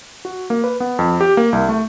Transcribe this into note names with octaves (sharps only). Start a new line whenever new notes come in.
F#4
A#3
B4
B3
F2
G4
A#3
C2
A3